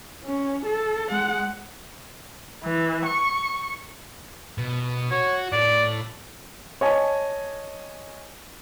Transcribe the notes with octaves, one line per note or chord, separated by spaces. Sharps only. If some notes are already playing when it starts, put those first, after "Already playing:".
C#4
A4
G#3 F#5
E3
C#6
B2
F#4 C#5
A2 D5
C#5 D#5 G#5 A5